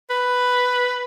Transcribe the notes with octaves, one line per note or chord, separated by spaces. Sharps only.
B4